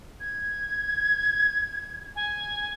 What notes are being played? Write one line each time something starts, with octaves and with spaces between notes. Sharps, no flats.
G#6
G#5